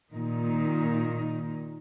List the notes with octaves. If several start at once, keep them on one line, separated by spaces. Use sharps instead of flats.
A#2 D#3 D#4